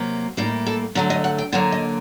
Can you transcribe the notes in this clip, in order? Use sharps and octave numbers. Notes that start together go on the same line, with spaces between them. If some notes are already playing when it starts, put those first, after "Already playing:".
Already playing: C3 F#3 A#3
A2 G3 A#3 D#4
A4
D3 F#3 A3 A#4
D#5
F#5
G5
D3 F#3 A#3 F#5
D#5